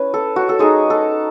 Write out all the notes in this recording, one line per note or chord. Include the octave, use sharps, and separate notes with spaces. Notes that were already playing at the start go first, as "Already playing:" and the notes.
Already playing: C#4 E4 B4
A4
F#4
A4
G#3 D#4 G#4
A4